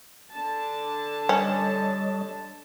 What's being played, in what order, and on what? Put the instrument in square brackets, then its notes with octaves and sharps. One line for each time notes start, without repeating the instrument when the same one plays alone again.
[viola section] D3 D4 A5
[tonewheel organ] G3 C#5 D#5 [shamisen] C#4